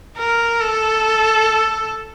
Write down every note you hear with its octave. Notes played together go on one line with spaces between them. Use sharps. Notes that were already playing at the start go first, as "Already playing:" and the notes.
A#4
A4